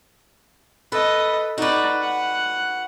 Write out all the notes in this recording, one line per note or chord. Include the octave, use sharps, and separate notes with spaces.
A4 B4 D#5
D#4 F#4 B4 D5
F#5